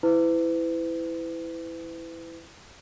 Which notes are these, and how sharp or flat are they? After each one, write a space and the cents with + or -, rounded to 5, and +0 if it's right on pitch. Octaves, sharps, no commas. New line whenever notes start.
E4 +0 B4 +40